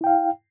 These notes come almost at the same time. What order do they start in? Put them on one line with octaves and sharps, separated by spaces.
E4 G5 F5